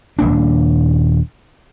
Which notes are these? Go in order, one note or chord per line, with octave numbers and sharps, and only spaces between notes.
D#1 G#1 A#3 D4